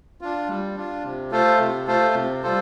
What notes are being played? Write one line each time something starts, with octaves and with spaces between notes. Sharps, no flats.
D4 F4
G3
D4 F4
C3
A3 F4 A4 C5
C3
A3 F4 A4 C5
C3
G3 F4 A4 C5